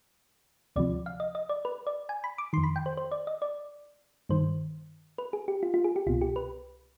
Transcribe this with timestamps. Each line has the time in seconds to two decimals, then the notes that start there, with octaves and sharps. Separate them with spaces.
0.76 D2 C3 F3 D5
1.06 F5
1.20 D#5
1.35 D#5
1.49 D5
1.65 B4
1.87 D5
2.09 G#5
2.24 B5
2.38 D6
2.53 D#3 C6
2.57 F2
2.63 B5
2.76 G5
2.86 C5
2.97 C5
3.12 D5
3.27 D#5
3.42 D5
4.29 G2 D#3 C5
5.18 B4
5.33 G#4
5.48 G4
5.63 F4
5.74 F4
5.84 G#4
5.96 G4
6.07 C2 F4
6.09 B2
6.21 G4
6.36 B4